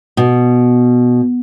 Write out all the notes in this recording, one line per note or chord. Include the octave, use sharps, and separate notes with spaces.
B2